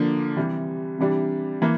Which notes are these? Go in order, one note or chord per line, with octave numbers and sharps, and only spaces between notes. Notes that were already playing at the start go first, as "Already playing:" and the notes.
Already playing: D3 F3 A#3 D4
C3 E3 G3
C3 E3 G3 D4
E3 A#3